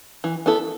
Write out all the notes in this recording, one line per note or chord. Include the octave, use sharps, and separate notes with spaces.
E3
B3 E4 A4